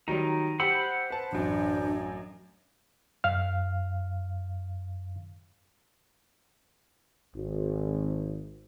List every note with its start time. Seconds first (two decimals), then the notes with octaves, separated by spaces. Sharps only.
0.08 D#3 F#3 G3 D#4
0.60 G4 C5 F#5 B5 E6
1.10 B4 A5
1.32 A1 F#2 D4
3.24 F#2 F5 F6
7.36 G#1